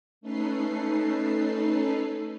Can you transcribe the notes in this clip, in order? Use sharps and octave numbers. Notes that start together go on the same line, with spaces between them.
A3 C#4 D#4 A4 B4 C7